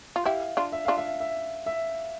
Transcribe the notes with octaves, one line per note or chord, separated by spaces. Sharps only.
F4
E4 G4 F5
D4 F4
E5
D4 F4 F5
E5
E5
E5